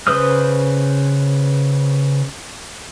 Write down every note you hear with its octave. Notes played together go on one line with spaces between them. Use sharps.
C#3 B4 C5 D#6 F6